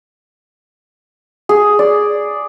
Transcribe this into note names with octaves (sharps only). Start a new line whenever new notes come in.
G#4
D5